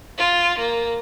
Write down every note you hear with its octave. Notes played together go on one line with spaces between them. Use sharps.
F4
A#3